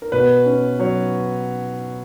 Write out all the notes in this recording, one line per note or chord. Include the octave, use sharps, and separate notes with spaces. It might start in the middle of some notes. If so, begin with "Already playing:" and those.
A#4
B2 B4
C#4
F#3 C#5